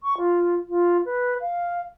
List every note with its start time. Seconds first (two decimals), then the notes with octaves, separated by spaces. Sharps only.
0.03 C#6
0.17 F4
0.69 F4
1.05 B4
1.41 F5